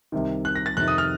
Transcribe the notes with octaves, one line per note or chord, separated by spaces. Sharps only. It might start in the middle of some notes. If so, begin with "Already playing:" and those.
C2 C3 D#3
F#6
A#6
A6
F2 C3 D#3 F#6
D#6
F6